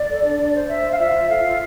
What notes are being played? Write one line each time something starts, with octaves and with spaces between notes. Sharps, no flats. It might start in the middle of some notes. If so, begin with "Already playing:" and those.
Already playing: D5
A4
D4
D4
C5
C5 E5
C5
F5
F4 E5
F4
A4 F5
F4